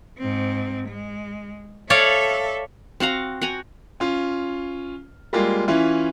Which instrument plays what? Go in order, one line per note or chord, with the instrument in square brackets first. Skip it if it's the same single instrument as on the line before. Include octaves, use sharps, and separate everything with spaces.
[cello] G#2 C4
G#3
[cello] A4 E5 [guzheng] C#5 D5 F5
[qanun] C4 F#4 F5 A#5
F#4 G5 G#5 A#5
[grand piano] C#4 F4
G3 G#3 A#3 F4
E3 C#4 E4 F4